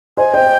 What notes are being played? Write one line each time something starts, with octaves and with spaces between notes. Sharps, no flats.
C5 D#5 G#5
C5 D#5 G5